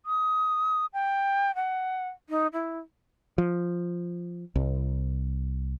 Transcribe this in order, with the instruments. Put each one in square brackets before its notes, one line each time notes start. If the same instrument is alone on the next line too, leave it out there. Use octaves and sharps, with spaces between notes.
[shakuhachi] D#6
G5
F#5
D#4
E4
[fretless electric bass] F3
C2